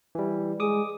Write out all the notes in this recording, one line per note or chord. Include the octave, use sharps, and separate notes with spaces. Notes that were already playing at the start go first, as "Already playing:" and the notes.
E3 G3
G#3 D6 D#6